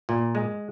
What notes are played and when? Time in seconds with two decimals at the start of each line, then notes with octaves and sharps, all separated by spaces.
0.09 A#2
0.35 G#3